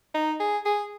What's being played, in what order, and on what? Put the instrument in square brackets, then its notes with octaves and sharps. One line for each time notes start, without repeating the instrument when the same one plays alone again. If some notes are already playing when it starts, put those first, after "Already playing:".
[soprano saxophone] D#4
G#4
G#4